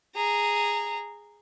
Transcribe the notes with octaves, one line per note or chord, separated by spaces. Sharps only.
G#4 A#5